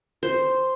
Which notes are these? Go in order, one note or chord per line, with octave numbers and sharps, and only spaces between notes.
C5